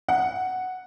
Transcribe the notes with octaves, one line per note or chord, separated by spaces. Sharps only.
F#5